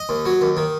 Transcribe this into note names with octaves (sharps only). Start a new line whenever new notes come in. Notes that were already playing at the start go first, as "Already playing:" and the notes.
Already playing: D#5
D#2
F#3
D#2
D#3